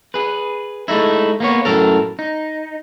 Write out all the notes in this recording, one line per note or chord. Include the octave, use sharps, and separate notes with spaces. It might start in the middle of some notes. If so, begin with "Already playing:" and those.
G#4 B4
G#3 A3 D#4 E4
A#3 B3 C#5
F#2 A2 A4 A#4
D#4